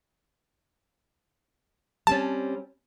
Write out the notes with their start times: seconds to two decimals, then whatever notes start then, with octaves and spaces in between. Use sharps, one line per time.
2.07 G3 C4 C#4 A5